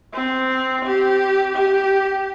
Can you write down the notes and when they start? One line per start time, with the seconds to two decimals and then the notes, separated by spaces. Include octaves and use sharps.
0.14 C4
0.86 G4
1.56 G4